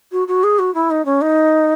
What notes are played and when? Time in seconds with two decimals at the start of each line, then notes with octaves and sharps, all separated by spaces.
0.12 F#4
0.28 F#4
0.44 G#4
0.59 F#4
0.74 E4
0.90 D#4
1.05 C#4
1.21 D#4